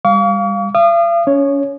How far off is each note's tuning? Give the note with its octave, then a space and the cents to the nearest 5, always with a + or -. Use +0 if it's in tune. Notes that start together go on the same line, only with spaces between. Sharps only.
G3 +30 F5 +0 C#6 +45
F5 -45 D#6 -35
C#4 +30 C#5 +0